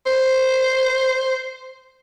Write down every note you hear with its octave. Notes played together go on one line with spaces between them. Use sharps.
C5